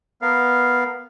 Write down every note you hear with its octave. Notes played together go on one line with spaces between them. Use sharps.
B3 A#4 F5